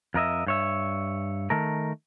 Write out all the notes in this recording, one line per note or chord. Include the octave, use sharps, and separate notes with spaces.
F2 A#4 D#5 E5
G2 C#5 E5
D#3 A3 A#4